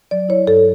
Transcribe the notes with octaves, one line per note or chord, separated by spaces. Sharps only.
F#3 D5
E4 C#5
G2 A4